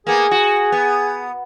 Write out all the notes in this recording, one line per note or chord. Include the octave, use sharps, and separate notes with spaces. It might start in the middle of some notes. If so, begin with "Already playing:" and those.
A#3 B3 G#4
F#4
B3